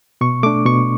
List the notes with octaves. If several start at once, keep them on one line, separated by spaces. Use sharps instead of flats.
B2 C#6
A3 D4 D6
B2 C#6